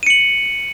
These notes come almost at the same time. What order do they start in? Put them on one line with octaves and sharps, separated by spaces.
D#7 C#7 F#7